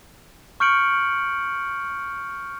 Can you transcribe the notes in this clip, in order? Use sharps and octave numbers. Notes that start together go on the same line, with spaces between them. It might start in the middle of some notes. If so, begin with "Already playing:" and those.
C#6 F6 G6 C#7 D7 F#7